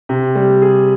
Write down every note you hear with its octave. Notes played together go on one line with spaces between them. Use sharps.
C3
G3
G#4